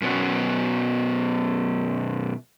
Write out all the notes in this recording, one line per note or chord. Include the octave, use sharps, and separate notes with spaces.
F#2 B2 B3 C#4 F#4